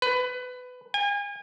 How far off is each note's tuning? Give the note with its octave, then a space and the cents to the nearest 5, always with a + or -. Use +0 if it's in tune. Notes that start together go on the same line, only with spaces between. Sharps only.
B4 +20
G#5 -35